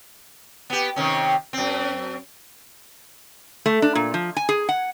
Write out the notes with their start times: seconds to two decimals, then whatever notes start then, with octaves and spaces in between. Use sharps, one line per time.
0.70 B3 G4
0.96 C3 D#3 C#4
1.53 F#2 C4
3.66 A3
3.82 D4
3.95 A#2
4.14 F3
4.36 G#5
4.49 G#4
4.69 F#5